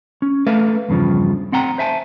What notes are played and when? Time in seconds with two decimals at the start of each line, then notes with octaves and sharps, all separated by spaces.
0.22 C#4
0.46 A3 A4 B4 E5 F5
0.89 E2 G2 C#3 F3
1.52 C4 F#5 G5 A#5
1.78 C5 E5 G#5 A5